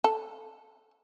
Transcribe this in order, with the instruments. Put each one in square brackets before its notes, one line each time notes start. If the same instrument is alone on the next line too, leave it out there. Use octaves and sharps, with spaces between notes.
[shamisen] A4